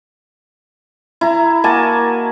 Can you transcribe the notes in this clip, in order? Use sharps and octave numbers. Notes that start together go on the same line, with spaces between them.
E4 A#5
A#3 F#4 G#5 A5